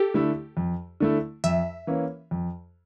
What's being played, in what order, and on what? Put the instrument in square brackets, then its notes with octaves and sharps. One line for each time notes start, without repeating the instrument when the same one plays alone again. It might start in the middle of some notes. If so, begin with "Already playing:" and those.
Already playing: [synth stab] G4 A4
[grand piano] D3 A3 E4
F2
D3 A3 E4
[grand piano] F2 [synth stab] E5
[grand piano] E3 A#3 C#4
F2